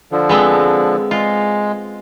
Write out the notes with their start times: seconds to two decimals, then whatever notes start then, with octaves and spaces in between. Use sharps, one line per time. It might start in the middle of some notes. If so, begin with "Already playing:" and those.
0.12 D3 F3
0.29 G#3 B3 C4
1.11 G#3 F4